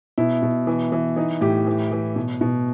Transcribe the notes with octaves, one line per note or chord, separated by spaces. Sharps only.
B2 E4
B2
E3
E3
E3 D#4
A2 G4
E3
E3
B2
B2